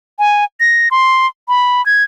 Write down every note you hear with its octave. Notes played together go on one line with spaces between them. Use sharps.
G#5
A#6
C6
B5
G#6